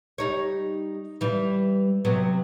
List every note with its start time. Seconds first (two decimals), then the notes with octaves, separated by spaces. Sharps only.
0.18 G3 D#4 C#5
1.21 E3 G3
2.05 C3 F#3 B3